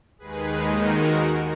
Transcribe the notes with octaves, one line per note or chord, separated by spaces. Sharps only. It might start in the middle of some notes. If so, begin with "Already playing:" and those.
D#2 D#3 G#3 D#4 G#4 B4
F#4 A#4